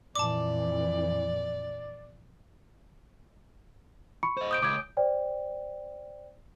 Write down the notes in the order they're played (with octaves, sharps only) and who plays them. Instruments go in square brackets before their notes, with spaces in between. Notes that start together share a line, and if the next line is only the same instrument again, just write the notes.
[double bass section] F2 A#2 E3 [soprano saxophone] D5 [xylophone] A5 D6
[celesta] B5 C#6 C#7
[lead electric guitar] C5 D#5
[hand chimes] D#6 G6 D7
[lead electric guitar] C#2 [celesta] D6 G#6
[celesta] C5 D5 G5